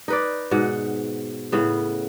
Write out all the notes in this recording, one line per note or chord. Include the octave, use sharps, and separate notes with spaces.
D#4 B4 D5
G#2 B2 F#5
A2 C#3 B3